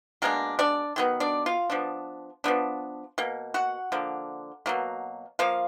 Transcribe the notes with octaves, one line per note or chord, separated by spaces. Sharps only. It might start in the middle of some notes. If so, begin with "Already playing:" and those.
B2 G#3 A#3 D4 A#4
D4 D5
D#3 F#3 B3
D4 D5
F4 F5
F3 B3 D4
F3 B3 D4
B2 A#3
F#4 F#5
D3 F3 A#3
B2 F#3 A#3
F3 A#3 F5